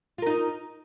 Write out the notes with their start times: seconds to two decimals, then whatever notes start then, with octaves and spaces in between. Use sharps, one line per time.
0.18 F4
0.22 A#4
0.26 D#4